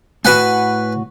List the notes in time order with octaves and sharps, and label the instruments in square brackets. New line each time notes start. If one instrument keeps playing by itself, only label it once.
[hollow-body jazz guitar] A2 F#4 [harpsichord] B4 F#5 G#5